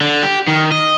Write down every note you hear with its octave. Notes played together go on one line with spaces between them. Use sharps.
D3
G4
D#3
D#5